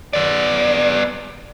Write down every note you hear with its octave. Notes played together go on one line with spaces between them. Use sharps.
B3 D5